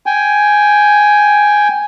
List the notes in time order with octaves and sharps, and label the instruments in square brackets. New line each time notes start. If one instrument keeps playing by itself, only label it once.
[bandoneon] G5 G#5